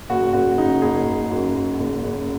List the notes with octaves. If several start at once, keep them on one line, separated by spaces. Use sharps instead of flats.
F#1 F#4
F#1 F#4
C#3 D#4
F#1 G#4
F#1
F#2
F#2
F#1
F#1